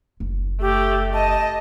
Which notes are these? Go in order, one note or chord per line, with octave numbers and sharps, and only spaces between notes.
F#1
A3 G4
D#5 A5